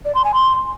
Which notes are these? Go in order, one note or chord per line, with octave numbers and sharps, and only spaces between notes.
D5
C6
G#5
C6